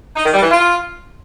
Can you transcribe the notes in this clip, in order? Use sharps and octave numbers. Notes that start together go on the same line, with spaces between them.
D#4
D#3
G3
E3
F4